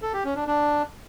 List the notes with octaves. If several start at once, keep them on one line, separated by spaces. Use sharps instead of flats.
A4
G4
C#4
D4
D4